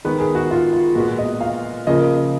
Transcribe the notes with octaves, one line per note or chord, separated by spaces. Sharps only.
D#3 G#3 B3 B4
G#4
F#4
F4
F4
A#2 G#3 B3 F#4
D#5
F5
C#3 F3 A#3 D#5